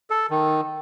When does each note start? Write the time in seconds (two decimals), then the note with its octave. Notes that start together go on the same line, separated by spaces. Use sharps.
0.10 A4
0.31 D#3